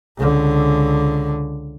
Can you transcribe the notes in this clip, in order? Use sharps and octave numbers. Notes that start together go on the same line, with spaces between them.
C#2 D3